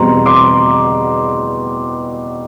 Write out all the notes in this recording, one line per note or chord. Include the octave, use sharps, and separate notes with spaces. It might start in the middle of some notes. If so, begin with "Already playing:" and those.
Already playing: E2 B2 G3 C4 A#5 C6
C6 D6